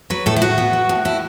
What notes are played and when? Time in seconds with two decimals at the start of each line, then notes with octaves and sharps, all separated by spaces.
0.10 F#3 B4
0.26 A2 A4
0.36 E4
0.42 A2 F#4
0.58 B3
0.73 F#3
0.89 A2
1.05 A2 E4